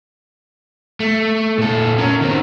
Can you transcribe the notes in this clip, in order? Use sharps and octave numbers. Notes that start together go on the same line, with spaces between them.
A3
A#2 A4
C#4 A#4
D#3 C4